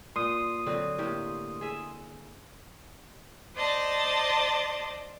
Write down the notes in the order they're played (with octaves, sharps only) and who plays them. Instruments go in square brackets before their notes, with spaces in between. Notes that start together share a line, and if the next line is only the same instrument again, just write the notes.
[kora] A#2 [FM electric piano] C6 D#6
[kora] D3 F#3 C4
A2 A#3 G4
G#4 E5
[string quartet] C5 D5 D#5 A5